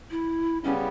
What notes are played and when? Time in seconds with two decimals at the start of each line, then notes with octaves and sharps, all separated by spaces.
0.11 E4
0.64 C#3 G3 B3 C#4